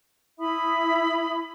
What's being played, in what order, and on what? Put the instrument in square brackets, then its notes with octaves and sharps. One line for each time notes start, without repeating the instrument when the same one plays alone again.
[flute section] E4 E5 B5 D#6